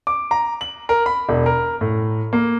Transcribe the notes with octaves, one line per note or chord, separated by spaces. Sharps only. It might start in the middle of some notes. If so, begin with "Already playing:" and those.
D6
A#5
F#7
A#4
B5
E1
A#4
A2
A#3